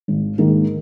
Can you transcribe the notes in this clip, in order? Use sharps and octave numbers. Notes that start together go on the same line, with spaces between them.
G#1
G#2 D#3 A#3 G#4